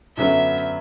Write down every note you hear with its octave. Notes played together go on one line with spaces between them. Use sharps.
F#2 D3 F#3 B3 E5